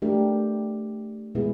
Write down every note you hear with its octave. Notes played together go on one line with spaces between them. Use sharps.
A3 D4 G4 A#4
B2 G#3 B3 E4 G#4